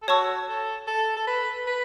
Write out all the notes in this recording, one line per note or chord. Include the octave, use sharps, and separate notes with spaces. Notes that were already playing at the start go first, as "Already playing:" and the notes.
A4
F#4 C#5 A5 C#6 E6
A4
A4
A4
B4
B4